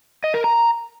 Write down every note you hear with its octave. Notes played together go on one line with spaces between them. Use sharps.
D#5
A#4
A#5